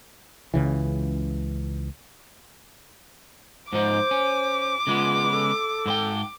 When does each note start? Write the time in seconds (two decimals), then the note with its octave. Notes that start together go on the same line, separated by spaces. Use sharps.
0.54 C#2 C#3 E3
3.73 G#2 F3 D#4 C5 D6
4.11 C#4
4.87 C#3 G#3 B3 F4
5.30 A4
5.86 G#2 C5 G5